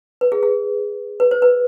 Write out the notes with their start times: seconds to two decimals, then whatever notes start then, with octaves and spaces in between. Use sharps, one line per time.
0.21 B4
0.32 G#4
0.43 G#4
1.20 B4
1.31 C5
1.42 B4